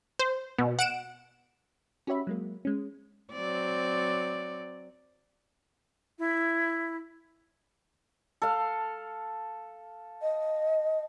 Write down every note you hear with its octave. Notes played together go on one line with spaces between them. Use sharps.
C5
B2
F#5 D7 E7
C#4 F#4 G4 C#5 E5 B5
F#3 G#3 A#3
G#3 C#4
F#3 C4 D5
E4
A4 F5
D#5